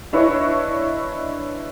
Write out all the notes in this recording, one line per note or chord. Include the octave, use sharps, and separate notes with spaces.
D4 E4 B4 C#5 D#5 C#6